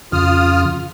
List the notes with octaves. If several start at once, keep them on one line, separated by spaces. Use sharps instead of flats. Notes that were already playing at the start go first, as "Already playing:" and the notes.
F2 C#3 F4 D#6 F6